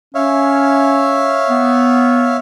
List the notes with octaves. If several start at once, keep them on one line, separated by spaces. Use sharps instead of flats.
C#4 C#5 E5 F5
B3